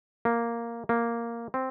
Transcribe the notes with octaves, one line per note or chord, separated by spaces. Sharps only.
A#3
A#3
C4